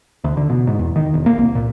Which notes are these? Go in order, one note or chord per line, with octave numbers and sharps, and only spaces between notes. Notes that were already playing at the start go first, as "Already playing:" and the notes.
D2
D3
B2
G#2
E2
D#3
E1
A#3
C2
A#2